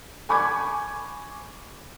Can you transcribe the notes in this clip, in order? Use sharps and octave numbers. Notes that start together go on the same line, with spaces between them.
G#5 B5 C#6 D6 G#6